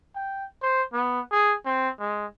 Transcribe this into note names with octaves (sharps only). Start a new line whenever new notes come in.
G5
C5
B3
G#4
C4
G#3